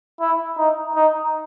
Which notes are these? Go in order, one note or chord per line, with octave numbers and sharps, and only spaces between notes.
E4
D#4
D#4